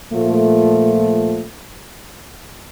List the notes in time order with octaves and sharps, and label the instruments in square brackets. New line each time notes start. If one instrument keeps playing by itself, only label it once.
[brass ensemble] A#2 F3 A3